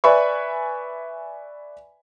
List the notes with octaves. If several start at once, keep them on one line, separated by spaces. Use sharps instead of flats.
B4 D5 E5 G#5 B5 C#6